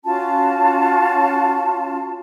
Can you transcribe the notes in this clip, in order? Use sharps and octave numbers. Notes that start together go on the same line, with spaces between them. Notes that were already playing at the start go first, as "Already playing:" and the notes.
C#4 F4 F#4 A5